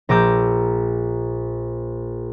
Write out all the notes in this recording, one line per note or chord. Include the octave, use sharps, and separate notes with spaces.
A#1 A#5 D6 E6 G6